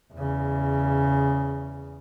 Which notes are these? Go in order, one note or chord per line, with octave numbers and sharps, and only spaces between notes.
E2 C#3